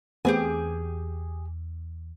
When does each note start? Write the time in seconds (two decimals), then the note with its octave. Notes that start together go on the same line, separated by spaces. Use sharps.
0.25 E2 A3 B3 C4 G4 G#4 G#5